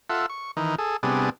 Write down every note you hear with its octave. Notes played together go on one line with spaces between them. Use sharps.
F4 A4 E5 F#5
C#6
D#3 E3 D#4
G#4 A4
C3 G3 B3 D4 G#4